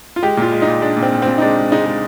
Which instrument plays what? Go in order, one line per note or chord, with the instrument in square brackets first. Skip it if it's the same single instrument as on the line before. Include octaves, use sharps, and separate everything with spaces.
[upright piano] F4
G#3 G4
A#2 F4
G#3
D#4
A#2
G#3 D4
A#2
C4
A#2
A#2 C4
D#4
G#3 D4
G#3
G#3 D#4
G#3